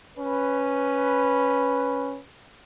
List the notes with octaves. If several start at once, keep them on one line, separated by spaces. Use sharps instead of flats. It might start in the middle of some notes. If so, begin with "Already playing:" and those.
C#4 B4